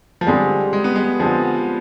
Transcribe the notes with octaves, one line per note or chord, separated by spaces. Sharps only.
F3
D3 G3 G#3 C4
G#3
B3
G#3
D3 F3 G#3 C4